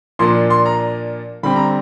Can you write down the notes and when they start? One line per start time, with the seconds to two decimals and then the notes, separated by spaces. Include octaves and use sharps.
0.19 A#2 F3 A#3 D4 C6
0.50 C6
0.66 A#5
1.43 D3 G3 C4 B5
1.56 A#5